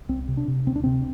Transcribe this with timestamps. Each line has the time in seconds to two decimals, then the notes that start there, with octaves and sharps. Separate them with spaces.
0.09 C2 C4
0.28 C3
0.37 D4
0.48 C3
0.67 D2 C4
0.76 D4
0.84 C3 C4